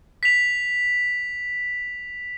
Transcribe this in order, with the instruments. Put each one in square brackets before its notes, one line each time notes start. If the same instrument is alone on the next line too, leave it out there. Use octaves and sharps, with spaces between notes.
[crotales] B6 F7